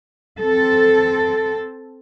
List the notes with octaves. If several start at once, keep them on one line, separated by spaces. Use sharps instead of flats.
C4 A4